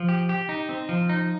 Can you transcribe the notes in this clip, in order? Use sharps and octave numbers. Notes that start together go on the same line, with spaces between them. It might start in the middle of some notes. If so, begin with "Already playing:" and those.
Already playing: F3
G4
G4
D#4
C4
F3
D#4